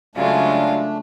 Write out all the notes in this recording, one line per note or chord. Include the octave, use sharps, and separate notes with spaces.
C#3 F#3 G#3 A3 D4 F4 F5